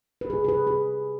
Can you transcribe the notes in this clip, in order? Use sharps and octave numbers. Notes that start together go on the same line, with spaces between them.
B4
C3 G3 G#4
G#4
B4
G#4